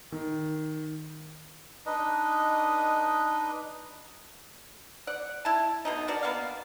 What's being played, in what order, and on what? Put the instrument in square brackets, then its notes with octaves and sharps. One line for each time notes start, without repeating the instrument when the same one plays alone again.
[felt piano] D#3
[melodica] D4 D#4 B4 D#5
[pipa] D5 F#5
E4 A5
B2 D3 D#4
D4 F#4 A#4 D5
A#3 B3 A#4 F5